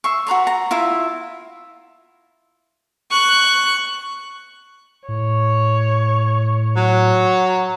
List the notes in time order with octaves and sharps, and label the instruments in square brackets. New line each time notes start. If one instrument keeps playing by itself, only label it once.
[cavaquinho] E5 C6 C#6
F#4 B4 A#5 C6
A#5
E4 F4 E5
[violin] C#6 F#6
[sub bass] A2 [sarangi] C#5
[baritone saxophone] F#3